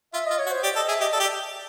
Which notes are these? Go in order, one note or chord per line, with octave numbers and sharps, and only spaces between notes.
F4 E5
F4 D#5
C#5
F#4
C5
G4 D5
A4 D#5
G#4 E5
G4 D#5
A4 D5
G4